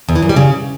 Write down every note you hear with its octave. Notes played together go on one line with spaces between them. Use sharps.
E2
E3
F#2
G3
C#3